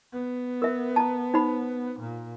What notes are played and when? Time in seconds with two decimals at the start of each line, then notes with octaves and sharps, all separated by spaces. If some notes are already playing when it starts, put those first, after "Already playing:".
0.13 B3
0.62 A#4 E5
0.96 A5 A#5
1.34 D#4 C5 B5
2.00 A#2